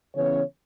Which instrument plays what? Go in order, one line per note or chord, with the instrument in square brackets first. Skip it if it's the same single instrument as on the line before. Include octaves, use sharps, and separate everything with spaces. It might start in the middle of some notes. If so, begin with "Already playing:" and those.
[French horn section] C#3 E3 B3 C#4 C#5